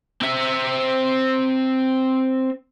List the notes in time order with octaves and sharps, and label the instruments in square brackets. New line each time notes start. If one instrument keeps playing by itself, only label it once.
[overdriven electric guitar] C4 E5